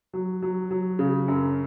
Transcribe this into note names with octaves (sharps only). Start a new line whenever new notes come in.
F#3
F#3
F#3
C#3
F#2